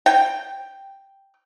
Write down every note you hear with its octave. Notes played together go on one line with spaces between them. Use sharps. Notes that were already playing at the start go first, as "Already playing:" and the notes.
G5